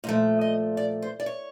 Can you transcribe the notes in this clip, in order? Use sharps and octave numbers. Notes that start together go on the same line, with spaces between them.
A#2 F3 A3 D#5
D#5
D5
C5
D5
C#5